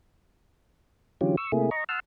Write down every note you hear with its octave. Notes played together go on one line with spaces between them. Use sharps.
D3 E3 F#3 C#4 F4 G4
C#6 E6
C3 A3 A#3 E4 G#4
D#5 A#5 C#6
F#5 A5 C6 E6 F6